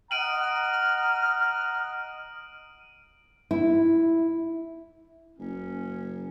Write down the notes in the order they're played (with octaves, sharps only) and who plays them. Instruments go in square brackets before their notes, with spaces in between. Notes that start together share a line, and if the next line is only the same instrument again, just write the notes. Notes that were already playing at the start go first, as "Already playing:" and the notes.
[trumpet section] D#5 F#5 A#5 [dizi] F6 [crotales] D7 D#7 F#7
[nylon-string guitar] E4
[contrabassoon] F#1 [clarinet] C#4